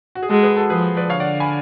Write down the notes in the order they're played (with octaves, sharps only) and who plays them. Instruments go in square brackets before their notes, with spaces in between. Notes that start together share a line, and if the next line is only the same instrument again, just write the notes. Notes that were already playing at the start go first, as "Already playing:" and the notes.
[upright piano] F#4
G#4
[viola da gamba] G#3 [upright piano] F#4 A4
[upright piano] G#4 B4
F#4 A4
[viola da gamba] F3 [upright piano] G#4 B4
[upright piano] B4 D5
[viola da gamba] D3 [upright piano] C#5 F5
[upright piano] D5 F#5
G#5 B5